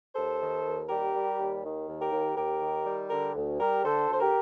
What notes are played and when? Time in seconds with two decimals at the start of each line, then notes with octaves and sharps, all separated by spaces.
0.15 D#2 A4 C5
0.40 D#3
0.65 D#2
0.89 G3 G4 A#4
1.14 G3
1.38 D#2
1.63 D#3
1.87 D#2
1.99 G4 A#4
2.12 D#2
2.36 D#2 G4 A#4
2.61 D#3
2.86 G3
3.10 D3 G4 A#4
3.35 D2
3.59 G3 G4 A#4
3.84 D3 A4 C5
4.08 D2 C5
4.20 G4 A#4